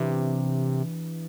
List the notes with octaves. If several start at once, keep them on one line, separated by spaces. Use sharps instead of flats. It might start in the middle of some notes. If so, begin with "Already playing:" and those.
Already playing: C3 E3 B3 D4 G4 B4